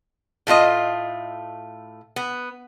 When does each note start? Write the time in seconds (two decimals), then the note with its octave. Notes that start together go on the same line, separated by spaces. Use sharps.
0.47 A2 A3 F4 D#5
2.16 B3